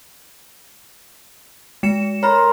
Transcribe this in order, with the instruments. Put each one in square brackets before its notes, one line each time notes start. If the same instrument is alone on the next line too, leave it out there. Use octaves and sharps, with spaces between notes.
[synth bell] G#3 C#7 E7
[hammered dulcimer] A#4 C5 [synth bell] C#5 B5